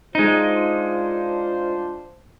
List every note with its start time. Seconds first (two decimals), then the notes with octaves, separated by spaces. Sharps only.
0.15 G#3 D4 D#4 F4 C5